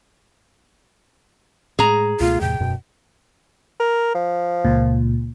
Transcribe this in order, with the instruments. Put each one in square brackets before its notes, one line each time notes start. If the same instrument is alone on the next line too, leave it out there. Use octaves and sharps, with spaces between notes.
[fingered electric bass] A2 G#3 [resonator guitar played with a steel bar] G#4 A#5
[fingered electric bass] C#2 B2 A3 [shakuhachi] F4
[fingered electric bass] E2 A2 C3 [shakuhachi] G5
[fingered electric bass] E1 F#2 B2
[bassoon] A#4
F3
[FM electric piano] C#2 A#2